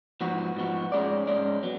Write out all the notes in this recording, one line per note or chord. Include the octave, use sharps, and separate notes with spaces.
G#2 F3 B3 F#4
G#2 F3 B3 F#4
G#2 G#3 C#4 G#4 D5
G#2 G#3 C#4 G#4 D5
F#3 B3